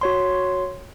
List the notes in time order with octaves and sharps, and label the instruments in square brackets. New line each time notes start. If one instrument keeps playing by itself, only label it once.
[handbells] F#4 C#5 C6